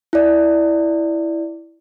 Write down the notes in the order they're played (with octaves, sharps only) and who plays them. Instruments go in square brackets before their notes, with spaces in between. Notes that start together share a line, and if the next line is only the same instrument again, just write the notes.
[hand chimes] E4 D5